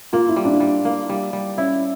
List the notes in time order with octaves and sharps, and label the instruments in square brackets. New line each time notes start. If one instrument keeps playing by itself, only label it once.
[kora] A#3 [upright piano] F4
[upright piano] E4
[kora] G3
[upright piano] D4
[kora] G3
A#3
G3
G3
[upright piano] C#4 [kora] E4